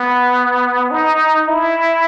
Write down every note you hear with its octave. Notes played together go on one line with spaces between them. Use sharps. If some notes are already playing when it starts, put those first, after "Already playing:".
Already playing: B3
D#4
E4